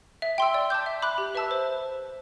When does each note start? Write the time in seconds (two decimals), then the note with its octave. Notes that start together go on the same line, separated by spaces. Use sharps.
0.22 E5
0.38 G5 C6 E6
0.54 D5
0.70 A5 D6 G6
0.86 E5
1.02 B5 D6 F#6
1.18 G4
1.35 B4 E5 A5 E6
1.51 C5